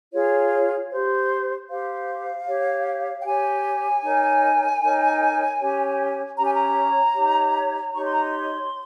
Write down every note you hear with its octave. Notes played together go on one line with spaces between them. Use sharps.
F4 G#4 C#5
G4 C5
G4 C5 F5
G4 C#5
G5
G4 C#5 G#5
D#4 A#4 C#5
D#4 A#4 C#5
C#4 G4 C#5
C#4 G4 C#5 A#5
G#5
A#5
D#4 G4 C#5
D#4 G4 C#5 C#6
C6
A#5
C6